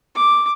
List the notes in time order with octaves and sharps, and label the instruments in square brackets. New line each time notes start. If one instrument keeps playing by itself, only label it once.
[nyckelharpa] D6